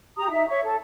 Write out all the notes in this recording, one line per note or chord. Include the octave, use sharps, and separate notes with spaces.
G4 A#5 D#6
D#4 E5
C#5 E5 C#6
A4